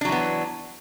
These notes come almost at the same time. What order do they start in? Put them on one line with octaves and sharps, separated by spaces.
D4 F#3 E3 B3